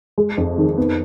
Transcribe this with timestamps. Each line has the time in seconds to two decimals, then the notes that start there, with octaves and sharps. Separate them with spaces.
0.18 G#3
0.38 F2
0.58 D#3
0.77 B3